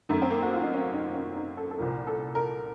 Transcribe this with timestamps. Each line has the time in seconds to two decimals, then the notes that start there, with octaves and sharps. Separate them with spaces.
0.09 F#2 D#3 A3
0.22 C4
0.30 A#3
0.42 F#4
0.53 F4
0.63 D#4
0.73 C#4
0.94 D#4
1.15 C#4
1.36 D#4
1.57 A4
1.71 A4
1.78 C2 A#2 F3 A#4
2.07 A4
2.35 A#4